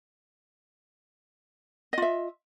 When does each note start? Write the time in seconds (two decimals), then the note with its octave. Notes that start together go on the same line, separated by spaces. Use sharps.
1.93 D#5
1.98 F4
2.02 E5